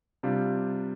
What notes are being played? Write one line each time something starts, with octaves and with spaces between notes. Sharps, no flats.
C3 G3 D4 F4